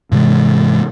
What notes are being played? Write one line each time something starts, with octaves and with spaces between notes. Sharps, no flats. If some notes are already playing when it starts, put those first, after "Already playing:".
G#2 C3 E3 G#3